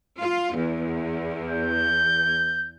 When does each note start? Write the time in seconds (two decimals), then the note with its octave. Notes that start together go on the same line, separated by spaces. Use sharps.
0.19 F4
0.55 E2
1.49 G6